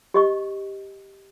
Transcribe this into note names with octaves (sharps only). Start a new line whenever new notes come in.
G4 D#5 C#6